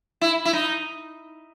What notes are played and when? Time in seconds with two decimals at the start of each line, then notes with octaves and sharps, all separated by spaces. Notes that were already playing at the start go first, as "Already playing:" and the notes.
0.21 E4
0.45 E4
0.53 D#4